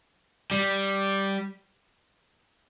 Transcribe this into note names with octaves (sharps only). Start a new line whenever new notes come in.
G3